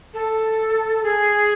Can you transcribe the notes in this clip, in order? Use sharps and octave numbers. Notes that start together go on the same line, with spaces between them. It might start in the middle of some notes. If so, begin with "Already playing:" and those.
A4
G#4